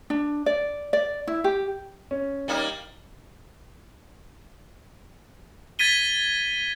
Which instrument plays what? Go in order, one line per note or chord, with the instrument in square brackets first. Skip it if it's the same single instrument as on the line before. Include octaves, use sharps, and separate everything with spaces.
[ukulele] D4
D5
D5
E4
G4
[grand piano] C#4
[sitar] G3 A#3 D#4
[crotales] G#6 A6 B6 D#7 G7